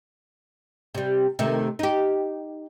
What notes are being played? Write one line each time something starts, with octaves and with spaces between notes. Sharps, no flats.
C3 G3
C3 D#3 A3
D#4 G4